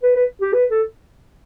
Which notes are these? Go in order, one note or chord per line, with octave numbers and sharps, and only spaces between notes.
B4
B4
G4
B4
A4